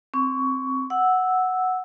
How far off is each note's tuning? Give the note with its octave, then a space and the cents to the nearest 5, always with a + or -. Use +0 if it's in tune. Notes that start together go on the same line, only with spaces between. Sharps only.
C4 +0 C#6 +20
F#5 +0 E6 -5